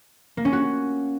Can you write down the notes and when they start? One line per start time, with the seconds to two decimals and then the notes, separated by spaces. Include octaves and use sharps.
0.37 A#3
0.45 C#4
0.53 F#4